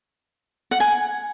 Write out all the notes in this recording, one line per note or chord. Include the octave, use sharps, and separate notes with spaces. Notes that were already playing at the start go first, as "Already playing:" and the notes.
F#5
G#5